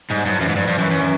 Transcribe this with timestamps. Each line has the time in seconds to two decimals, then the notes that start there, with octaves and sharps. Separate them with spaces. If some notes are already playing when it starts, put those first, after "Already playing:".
0.10 G#2 G3
0.26 G2 F#3
0.40 F#2 E3
0.49 G#2
0.56 G2 F3
0.68 G2
0.79 F#2 E3
0.91 F#2
1.02 E3